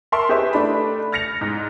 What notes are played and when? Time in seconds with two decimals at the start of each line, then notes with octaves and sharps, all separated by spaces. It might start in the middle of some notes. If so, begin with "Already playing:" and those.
0.12 A#4 E5 A5 C6 C#6
0.29 G4 G#4 B4 C5 D#5 E5
0.53 A3 D4 B5
1.12 F6 A6 A#6 C#7 F7
1.41 G#2